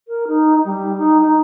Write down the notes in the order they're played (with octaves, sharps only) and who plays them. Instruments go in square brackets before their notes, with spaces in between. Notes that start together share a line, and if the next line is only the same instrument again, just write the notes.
[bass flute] A#4
D#4
G3
D#4
D#4